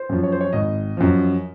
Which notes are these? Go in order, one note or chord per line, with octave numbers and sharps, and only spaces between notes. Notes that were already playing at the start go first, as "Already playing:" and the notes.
Already playing: C5
F#2 F3
C#5
C5
C#5
G#1 D#5
F#2 F3